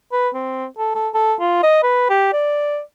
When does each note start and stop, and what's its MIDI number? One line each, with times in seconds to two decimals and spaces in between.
0.12 0.29 71
0.34 0.65 60
0.78 0.90 69
0.95 1.09 69
1.14 1.34 69
1.40 1.60 65
1.63 1.81 75
1.83 2.07 71
2.09 2.31 67
2.33 2.80 74